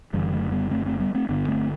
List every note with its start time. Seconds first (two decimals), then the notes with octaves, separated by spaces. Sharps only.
0.13 F#1 F#2 D3 E3 G3
0.32 F#3 A3
0.51 G3 B3
0.71 A3 C4
0.86 A3 C4
1.00 G3 B3
1.14 A3 C4
1.29 G1 G2 D3 B3 D4
1.49 A3 C4